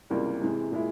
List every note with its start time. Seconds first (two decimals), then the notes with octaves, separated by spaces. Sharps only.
0.10 C#2 C3 E3 G3 A#3
0.42 C3 E3 G#3
0.72 A#2 G#3 E4